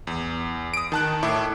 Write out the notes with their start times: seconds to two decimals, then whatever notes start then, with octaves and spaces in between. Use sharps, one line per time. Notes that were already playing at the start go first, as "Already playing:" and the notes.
0.07 E2
0.74 D#6 D7
0.92 D#3 A5 F#6
1.23 A2 E4 D6